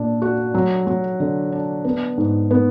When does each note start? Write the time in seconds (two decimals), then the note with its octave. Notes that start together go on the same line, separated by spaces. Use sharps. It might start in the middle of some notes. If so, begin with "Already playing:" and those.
Already playing: A#2 D4
0.22 F#4
0.54 F#3
0.87 F#3
1.20 D3
1.52 D4
1.85 B3
2.18 G#2
2.51 B3